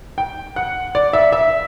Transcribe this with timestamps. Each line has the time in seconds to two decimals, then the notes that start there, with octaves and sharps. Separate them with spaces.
0.18 G5
0.56 F#5
0.95 D5
1.13 E5
1.33 E5